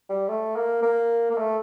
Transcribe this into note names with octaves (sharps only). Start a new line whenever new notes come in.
G3
A3
A#3
A#3
A#3
A3